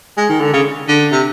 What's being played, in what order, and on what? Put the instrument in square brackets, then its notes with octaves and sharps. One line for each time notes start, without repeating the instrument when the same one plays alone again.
[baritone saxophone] G#3
D#3
D3
C#3
D3
C3